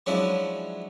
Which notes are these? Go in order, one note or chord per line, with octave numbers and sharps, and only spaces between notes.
F3 F#3 G#3 C#4 D4 E4